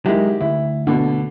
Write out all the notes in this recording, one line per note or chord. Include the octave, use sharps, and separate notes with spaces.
D#3 F#3 G#3 E4 G4
D2 E4
B2 D3